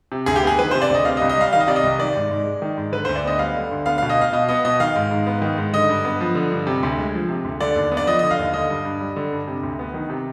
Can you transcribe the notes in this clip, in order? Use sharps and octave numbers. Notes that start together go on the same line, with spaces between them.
C3
D2 G#4
G4
B3 G#4
D#3 B4
C3 C5
D5
D2 D#5
C3 F5
D#5
C2
D#5
G3 F5
D#3 F5
D#5
C3 D5
D#5
C2
D#3 D5
G#2
G#2
G#3
D#3
G#2
D3 B4
D2 C5
D5
B3 D#5
G3 F5
D3
D2
B3 F5
B2 F5
D#5
B3 F5
B2 D#5
B3 D#5
B2 D#5
D#3 F5
G#2
G#2
B3
D#3
G#2
D3 D#5
G2
B3
F3
D3
G2
C3
D2
G#3
F3
C3
D2
D3 D5
D#2
B3
D5
F3 D#5
D3 D#5
F5
D#2
D3 D#5
G2
G2
G3
D3
G2
C3
D2
B3
D#3
C3